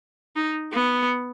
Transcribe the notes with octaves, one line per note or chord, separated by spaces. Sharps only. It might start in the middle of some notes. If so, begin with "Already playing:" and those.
D#4
B3